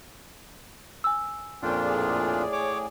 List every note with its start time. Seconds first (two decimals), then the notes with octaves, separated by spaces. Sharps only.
1.04 G#5 E6
1.62 F2 A#2 C#4 D4 F4 G5
1.85 A2 G#4 D5
2.52 C#5 D6